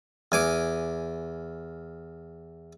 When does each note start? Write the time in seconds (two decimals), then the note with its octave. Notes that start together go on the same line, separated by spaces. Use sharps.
0.32 E2 G#5 D6